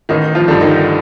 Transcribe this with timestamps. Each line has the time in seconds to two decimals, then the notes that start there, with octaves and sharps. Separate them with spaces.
0.09 A1 D#3 D#4
0.35 F3 F4
0.48 G2 D3
0.61 D#3 D#4